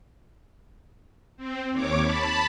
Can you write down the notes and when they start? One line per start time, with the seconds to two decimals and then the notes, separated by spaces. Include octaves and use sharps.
1.37 C4
1.71 D#2 C#5 D6
2.00 A5 B5